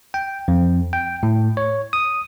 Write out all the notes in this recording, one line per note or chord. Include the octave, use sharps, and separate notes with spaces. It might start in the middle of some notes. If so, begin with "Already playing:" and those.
G5
F2
G5
A2
C#5
D#6